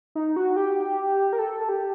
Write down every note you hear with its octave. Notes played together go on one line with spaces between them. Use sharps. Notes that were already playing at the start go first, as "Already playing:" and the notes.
D#4
F#4
G4
A#4
A4
G4